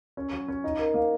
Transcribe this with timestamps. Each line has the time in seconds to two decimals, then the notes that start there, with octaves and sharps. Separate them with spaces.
0.17 C#4
0.33 F#3
0.48 C#4
0.64 D#4
0.79 A#4
0.94 A#3